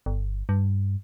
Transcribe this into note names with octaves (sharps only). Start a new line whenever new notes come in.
G1
G2